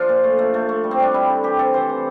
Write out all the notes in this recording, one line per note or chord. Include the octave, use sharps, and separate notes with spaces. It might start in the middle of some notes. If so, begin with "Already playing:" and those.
Already playing: F3 D4 F4
A#2
A3
A3
A3
A3
G3
C4
G3 D4
G3 E4
D3
E3 G4
C3 A4
E3 C5
E3